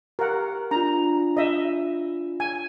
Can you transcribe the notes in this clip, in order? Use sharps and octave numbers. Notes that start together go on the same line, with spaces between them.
G4 A#4 F#5
D4 F4 A#5
D#5 E5
G#5